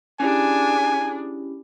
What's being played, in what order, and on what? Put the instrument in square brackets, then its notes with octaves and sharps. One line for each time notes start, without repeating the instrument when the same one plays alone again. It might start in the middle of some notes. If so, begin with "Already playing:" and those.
[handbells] C#4 E4 G4 [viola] D4 G#4 [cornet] G#5